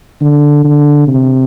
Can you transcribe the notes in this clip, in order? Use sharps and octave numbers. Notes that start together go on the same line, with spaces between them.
D3
D3
C3